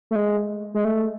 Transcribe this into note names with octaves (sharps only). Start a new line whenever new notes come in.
A3
G#3
G#3
A3